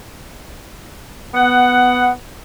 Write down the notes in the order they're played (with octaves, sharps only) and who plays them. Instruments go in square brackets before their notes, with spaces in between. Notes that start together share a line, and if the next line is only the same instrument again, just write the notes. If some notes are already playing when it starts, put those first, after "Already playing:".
[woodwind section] B3 F#5